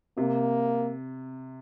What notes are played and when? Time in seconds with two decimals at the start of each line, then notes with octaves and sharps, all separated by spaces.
0.17 C3 A#3